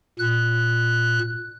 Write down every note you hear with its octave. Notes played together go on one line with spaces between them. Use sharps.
A#2 F#6